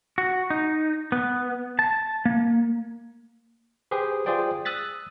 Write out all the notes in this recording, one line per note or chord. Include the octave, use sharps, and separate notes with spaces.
F#4
D#4
B3
A5
A#3
G4 G#4 B4 C5
F4 G#4 C5 D5 G5
D#6 E6 F#6 A6 B6